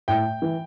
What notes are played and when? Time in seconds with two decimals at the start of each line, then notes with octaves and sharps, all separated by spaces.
0.08 A2 G5
0.42 E3